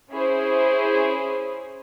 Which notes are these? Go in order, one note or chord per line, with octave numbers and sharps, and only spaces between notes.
C#4 E4 G#4 C5